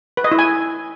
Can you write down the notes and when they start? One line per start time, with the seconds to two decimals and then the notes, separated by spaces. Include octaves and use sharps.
0.17 B4
0.24 D#5
0.32 E4
0.39 G#5